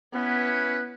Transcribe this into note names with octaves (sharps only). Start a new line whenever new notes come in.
B3 C#4 E4 B4 F#5